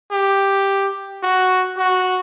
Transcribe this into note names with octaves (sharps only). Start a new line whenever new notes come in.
G4
F#4
F#4